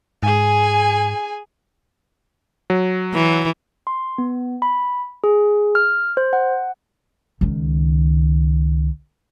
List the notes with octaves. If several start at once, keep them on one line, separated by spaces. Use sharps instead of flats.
G#2 G#4 G#5
F#3
E3
C6
B3
B5
G#4
F6
C5
F#5
C#2 D#3